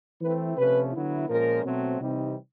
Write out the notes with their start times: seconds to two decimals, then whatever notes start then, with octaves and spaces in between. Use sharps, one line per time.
0.21 E3 A3 C4 E4 B4
0.57 C3 F3 A3 C#4 B4
0.93 D3 F#3 B3 E4
1.28 A#2 F3 G#3 C#4 A#4
1.64 B2 F#3 A3 C4
1.99 C3 E3 G3 C4 D#4